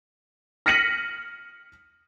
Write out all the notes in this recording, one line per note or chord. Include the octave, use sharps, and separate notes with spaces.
F6 A#6 B6 C#7 D#7 F#7